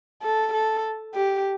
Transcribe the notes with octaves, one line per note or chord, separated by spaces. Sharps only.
A4
A4
G4